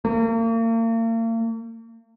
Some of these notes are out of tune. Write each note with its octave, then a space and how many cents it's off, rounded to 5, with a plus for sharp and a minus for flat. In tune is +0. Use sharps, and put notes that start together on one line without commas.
A#3 -40